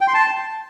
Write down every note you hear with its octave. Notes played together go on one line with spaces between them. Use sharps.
G5
C6
A5